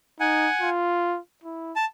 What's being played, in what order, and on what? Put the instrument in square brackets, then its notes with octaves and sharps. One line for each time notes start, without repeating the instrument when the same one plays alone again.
[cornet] D#4 [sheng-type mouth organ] F#5 G#5
[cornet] F4
E4
[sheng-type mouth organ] A5